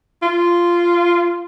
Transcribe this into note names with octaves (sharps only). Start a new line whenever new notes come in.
F4